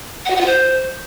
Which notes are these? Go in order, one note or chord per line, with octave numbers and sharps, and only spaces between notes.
F#5
F#4
F#5
F4
C5